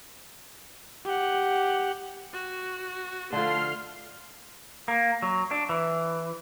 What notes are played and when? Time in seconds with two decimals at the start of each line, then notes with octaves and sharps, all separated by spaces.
1.05 G4 F#5
2.33 F#4
3.33 D3 F3 A3 C6 F6 C7
4.88 A#3
5.22 F#3
5.51 D4
5.69 E3